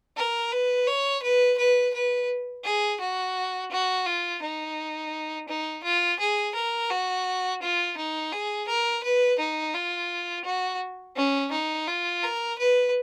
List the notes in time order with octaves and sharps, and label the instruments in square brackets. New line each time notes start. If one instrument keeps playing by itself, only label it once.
[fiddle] A#4
B4
C#5
B4
B4
B4
G#4
F#4
F#4
F4
D#4
D#4
F4
G#4
A#4
F#4
F4
D#4
G#4
A#4
B4
D#4
F4
F#4
C#4
D#4
F4
A#4
B4